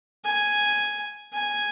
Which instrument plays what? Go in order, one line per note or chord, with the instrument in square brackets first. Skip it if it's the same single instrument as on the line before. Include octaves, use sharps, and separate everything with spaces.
[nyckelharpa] G#5
G#5